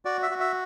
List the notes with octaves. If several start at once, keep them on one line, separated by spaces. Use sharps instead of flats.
F#4 D5
E5
F#4
E5